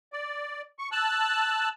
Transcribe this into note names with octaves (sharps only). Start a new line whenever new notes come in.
D5
C#6
A5 E6 F#6